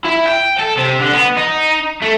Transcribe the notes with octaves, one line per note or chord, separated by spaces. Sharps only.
E4
G5
A4
C3
D3
B3
D#4
A3